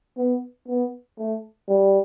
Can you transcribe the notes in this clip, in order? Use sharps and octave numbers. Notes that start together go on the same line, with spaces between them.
B3
B3
A3
G3